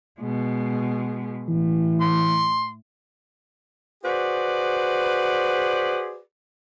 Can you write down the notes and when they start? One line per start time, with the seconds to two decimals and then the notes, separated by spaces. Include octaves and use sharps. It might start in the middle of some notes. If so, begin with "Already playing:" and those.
0.21 B2 G#3
1.49 A2 E3
2.01 C6
4.04 F#4 G#4 B4 C5 D5